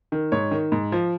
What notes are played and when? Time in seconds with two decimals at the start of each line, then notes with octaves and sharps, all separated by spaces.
0.12 D#3
0.32 G#2 C#5
0.51 D#3
0.72 G#2
0.92 F3